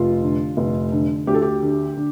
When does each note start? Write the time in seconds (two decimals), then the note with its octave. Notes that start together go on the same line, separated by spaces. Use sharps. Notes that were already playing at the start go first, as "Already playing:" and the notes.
Already playing: F1 F4
0.22 D3
0.57 F1
0.92 D3
1.27 D2 G4
1.34 A4
1.42 G4
1.62 D3
1.97 D3